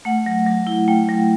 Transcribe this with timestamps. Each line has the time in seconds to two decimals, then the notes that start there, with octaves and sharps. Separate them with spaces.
0.05 A3 F#5
0.26 F#3
0.47 F#3
0.67 E4
0.88 A3 G5
1.08 F#3